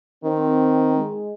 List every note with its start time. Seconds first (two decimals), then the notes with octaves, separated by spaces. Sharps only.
0.24 D#3 C4
0.97 G#3